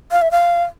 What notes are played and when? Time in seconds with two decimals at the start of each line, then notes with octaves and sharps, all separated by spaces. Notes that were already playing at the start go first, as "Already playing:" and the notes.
0.12 F5
0.22 E5
0.31 F5